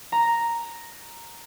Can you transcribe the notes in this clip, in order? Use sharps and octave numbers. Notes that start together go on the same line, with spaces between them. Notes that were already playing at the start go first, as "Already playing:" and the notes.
A#5